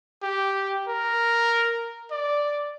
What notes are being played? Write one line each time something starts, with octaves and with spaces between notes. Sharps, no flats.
G4
A#4
D5